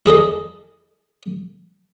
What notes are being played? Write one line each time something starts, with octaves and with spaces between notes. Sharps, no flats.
E4 G#4 A4 D#5